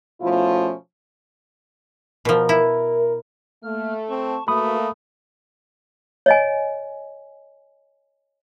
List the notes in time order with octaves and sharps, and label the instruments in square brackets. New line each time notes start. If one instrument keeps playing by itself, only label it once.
[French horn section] B2 F3 A3 C#4 E4 F4
[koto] B2 F3 [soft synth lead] A#4
[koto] E4
[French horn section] A3 [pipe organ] A#3 F6
[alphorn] C4 [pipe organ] A5 C#6
[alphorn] A3 [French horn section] A#3 [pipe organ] F#4 B4 [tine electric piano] B5 D#6
[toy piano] C#5 D#5 G#5